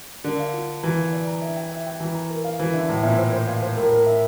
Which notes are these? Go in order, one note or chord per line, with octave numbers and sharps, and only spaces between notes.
D3 A#4
F5
F4
F4
E3 A#5
F5
D5
A#5
E5
G5
E5
G5
E3 A#5
A#5
A#4
F5
E3 C5
D3 E5
A2 E5
A#2 E5
C5
C5
F5
C5
A2 A#4
A#4
E5